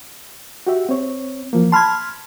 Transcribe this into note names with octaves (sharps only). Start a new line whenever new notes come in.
F#4 G4 E5
C4 C#5
E3 F3 A#3
A5 B5 C6 F6 G#6